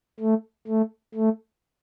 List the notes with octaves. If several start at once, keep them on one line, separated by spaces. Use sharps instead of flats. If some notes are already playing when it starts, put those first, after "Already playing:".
A3
A3
A3